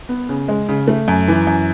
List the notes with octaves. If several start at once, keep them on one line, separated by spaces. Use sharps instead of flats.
B3
C#3
G#3
C#3
A3
F#2
E3
F#2